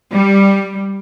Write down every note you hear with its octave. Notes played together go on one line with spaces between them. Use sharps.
G3